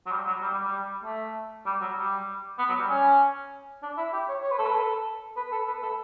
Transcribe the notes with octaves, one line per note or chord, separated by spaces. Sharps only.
F#3
G3
F#3
G3
G3
G3
A3
G3
F#3
G3
B3
F#3
G3
C#4
D4
E4
G4
C#5
C#5
B4
A4
B4
A4
B4
A4
B4
A4